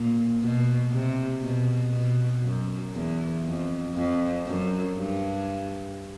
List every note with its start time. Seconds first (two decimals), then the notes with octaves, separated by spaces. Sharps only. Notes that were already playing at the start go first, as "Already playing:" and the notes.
Already playing: A#2
0.41 B2
0.91 C3
1.42 B2
1.92 B2
2.43 F#2
2.94 E2
3.45 F2
3.95 F2
4.46 F#2
4.96 G2